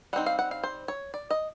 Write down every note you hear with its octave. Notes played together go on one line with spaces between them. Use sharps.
G3 C4 D#4 F#5
F5
F#5
F5
C5
C#5
D5
D#5